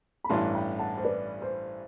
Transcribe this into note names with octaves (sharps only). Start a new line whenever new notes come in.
B5
A1 G2 E3 A5 C6
G5 B5
F#5 A5
C5
B4 D5
C5